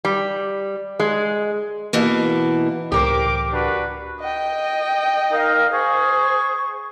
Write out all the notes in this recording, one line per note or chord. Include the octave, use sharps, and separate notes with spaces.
G3
G#3
B2 E3 A#3
C#2 A2 E3 G4 A#4 C5 D6
D4 F#4 B4
D#5 G5
D#4 A#4 F5
G#4 C5 C#6